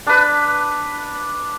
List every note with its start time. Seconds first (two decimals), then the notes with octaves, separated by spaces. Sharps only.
0.07 D4 B4